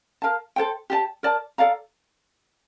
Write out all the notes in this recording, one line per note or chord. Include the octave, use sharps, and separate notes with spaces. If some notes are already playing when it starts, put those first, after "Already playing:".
A#4 F5 A5
A4 C5 G5
G4 D5 A5
A#4 D5 A5
A4 D5 F5 A#5